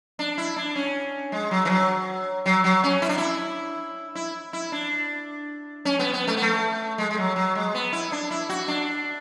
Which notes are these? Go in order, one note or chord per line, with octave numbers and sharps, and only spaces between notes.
D4
E4
D4
C#4
G#3
F#3
E3
F#3
F#3
F#3
C#4
E4
D4
E4
E4
E4
D4
C#4
B3
B3
A3
B3
A3
G#3
G#3
F#3
F#3
G#3
B3
E4
D4
E4
F#4
D4